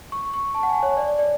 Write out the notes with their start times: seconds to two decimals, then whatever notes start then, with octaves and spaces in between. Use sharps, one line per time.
0.12 C#6
0.34 C#6
0.55 A5
0.63 F#5
0.69 G#5
0.83 C#5
0.97 D5
1.08 D5
1.19 D5